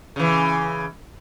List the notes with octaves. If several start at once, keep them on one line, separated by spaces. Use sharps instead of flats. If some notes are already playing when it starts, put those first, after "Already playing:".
C#3 E3